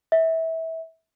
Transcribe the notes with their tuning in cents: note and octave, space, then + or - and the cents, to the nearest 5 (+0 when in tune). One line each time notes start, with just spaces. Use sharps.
E5 -25